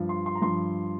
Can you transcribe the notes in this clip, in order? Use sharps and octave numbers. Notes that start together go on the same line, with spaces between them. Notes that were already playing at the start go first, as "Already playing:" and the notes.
Already playing: G2 F3
C6
C6
A#5
G2 F3 C6